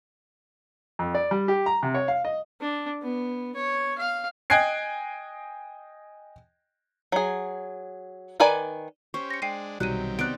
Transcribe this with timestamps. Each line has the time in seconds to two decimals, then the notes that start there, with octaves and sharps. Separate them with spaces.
0.99 F2
1.15 D5
1.31 G3
1.48 G4
1.66 A#5
1.83 C3
1.94 C#5
2.08 F5
2.25 D#5
2.61 D4
3.02 B3
3.55 C#5
3.98 F5
4.50 D#5 G5 G#5 F#6 G#6 C7
7.12 F#3 G#4
8.40 D#3 A#4 B4 D5 G#5
9.14 C#4 G4 C5 C#6
9.30 A#6 C#7
9.42 G#3 D4 G5 C7 D#7
9.80 B1 C3 D#3 F#3 G3 G4 F#6 D#7
10.19 B3 C4 D#4 D5 F#6 D7